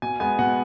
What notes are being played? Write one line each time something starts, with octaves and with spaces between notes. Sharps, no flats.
B2 G#5
G#3 B3 G#5
B2 F#5